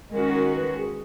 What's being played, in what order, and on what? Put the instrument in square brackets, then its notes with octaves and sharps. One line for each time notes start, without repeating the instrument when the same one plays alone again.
[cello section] D#3 G#3 C#4 F#4 [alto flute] A#4
[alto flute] A#4
B4
G#4